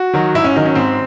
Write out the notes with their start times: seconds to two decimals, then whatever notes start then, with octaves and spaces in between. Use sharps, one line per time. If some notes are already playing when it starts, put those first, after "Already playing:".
Already playing: F#4
0.13 D#3 F#3
0.35 G#2 E4
0.44 C#4
0.55 D#3 F#3 D#4
0.65 C#4
0.75 G#2 C4